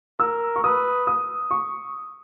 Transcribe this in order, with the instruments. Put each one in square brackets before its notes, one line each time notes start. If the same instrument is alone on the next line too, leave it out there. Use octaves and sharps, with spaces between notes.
[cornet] A#4 [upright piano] E6
[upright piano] C#6
[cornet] B4 [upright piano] D#6
[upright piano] D#6
C#6